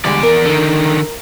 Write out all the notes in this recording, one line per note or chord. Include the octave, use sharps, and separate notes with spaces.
E2 D3 G3 G#3 D5
A#4
D3 D#3